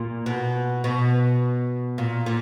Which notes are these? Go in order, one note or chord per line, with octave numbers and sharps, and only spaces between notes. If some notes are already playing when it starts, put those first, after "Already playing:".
Already playing: A#2
B2
B2
A#2
A#2